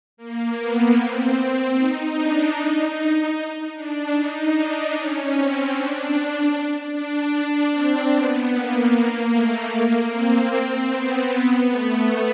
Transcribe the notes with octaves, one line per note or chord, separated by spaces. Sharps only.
A#3
B3
C4
D#4
D4
D#4
D4
D#4
D4
C#4
C4
D4
D4
C4
B3
A#3
A#3
A3
A#3
C4
B3
A3